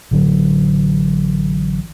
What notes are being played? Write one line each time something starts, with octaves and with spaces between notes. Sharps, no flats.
A1 D3 F#3